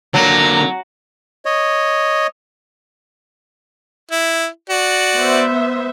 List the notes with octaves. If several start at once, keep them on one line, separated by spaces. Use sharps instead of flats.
D3 F#3 A#3 A#5
C#5 D#5
E4
F#4 D5
B3 C5 E5